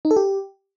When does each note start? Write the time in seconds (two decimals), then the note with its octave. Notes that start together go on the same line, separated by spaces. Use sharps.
0.05 D#4
0.11 A4
0.16 G4